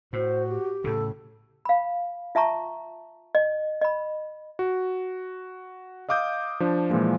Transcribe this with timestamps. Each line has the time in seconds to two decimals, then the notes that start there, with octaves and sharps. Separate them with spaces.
0.13 A2 F#4 C5
0.48 G4
0.84 A2 C#3 A4
1.65 F5 B5
2.35 F4 E5 A5 A#5 C#6
3.35 D#5
3.81 D#5 B5
4.59 F#4
6.09 D#5 F5 D6 D#6 G6
6.60 F3 D4
6.90 A#2 E3 F3 G#3 A#3